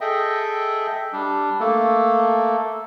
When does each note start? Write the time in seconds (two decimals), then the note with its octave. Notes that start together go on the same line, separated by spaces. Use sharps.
0.01 G#4 A4 D#5 E5 G5
1.13 G3 D4
1.60 A3 A#3 A4